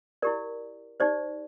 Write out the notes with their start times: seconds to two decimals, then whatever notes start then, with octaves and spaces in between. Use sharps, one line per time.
0.22 E4 G4 A#4 D5
1.00 D#4 G4 C5 D5